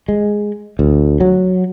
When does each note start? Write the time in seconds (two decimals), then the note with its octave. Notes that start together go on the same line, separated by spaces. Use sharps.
0.08 G#3
0.79 D2
1.20 F#3